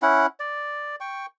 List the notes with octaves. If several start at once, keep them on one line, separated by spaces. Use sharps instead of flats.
C#4 E4 F#5
D5
G5 C#6